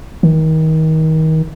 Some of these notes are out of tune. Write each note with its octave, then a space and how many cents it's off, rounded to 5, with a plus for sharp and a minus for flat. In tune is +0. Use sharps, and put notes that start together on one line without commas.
D#3 +30